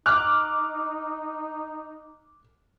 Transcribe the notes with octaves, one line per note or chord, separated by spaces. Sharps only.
D#4 D6 F6 F#6